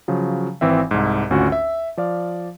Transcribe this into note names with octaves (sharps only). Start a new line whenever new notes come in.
C#3 F3 F#3
G#1 E3 C4 E5
C2 G#2
G#1 D2 C#4 F4 F#4
E5
F3 D5 F5